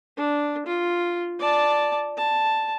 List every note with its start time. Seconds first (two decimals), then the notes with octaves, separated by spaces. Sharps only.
0.17 D4
0.66 F4
1.39 D5 A5
2.17 A5